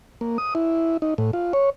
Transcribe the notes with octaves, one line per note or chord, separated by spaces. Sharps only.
A#3
D#6
E4
D#4
A2
F4
C#5